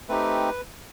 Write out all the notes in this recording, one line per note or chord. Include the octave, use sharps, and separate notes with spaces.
A3 C4 D#4 G4 B4